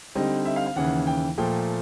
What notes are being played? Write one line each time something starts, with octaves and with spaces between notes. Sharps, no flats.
D3 G3 C4 D#4 D#5
E5
F5
F5
D#2 C#3 E3 F#5
G5
A#2 F3 A3 G5